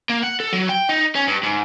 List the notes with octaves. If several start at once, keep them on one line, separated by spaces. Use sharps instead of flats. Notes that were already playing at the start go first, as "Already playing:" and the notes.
A#3
F#5
A4
F#3
G5
D#4
C#4
G2
G#2